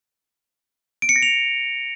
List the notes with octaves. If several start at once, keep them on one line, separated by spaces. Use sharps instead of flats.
D7
C#7
A#6
F7